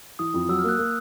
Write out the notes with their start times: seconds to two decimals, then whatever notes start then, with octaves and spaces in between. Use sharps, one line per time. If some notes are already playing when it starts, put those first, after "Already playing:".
0.19 E3 D#6
0.34 F2
0.49 F#3 E6
0.59 F6
0.64 A#3 F#6
0.78 A#3